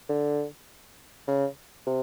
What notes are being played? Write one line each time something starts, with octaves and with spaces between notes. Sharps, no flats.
D3
C#3
C3